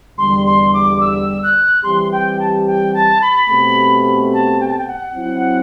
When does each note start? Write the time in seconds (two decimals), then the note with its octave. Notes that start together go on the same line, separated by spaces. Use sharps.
0.18 E2 D3 G3 C6
0.46 C6
0.73 D6
1.01 E6
1.43 F#6
1.83 E3 G3 C4 G4 C6
2.12 G5
2.40 A5
2.67 G5
2.94 A5
3.22 B5
3.49 B2 A3 C4 G4
4.33 A5
4.60 G5
4.68 A5
4.78 G5
4.87 F#5
5.15 F#3 C4 E4